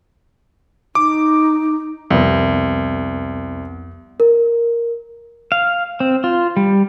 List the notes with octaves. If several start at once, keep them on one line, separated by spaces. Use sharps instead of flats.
D#4 D6
C2 F2 B3
A#4
F5
C4
F4
G3